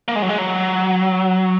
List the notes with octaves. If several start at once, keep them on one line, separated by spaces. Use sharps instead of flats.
A#3
G#3
F#3
G#3
F#3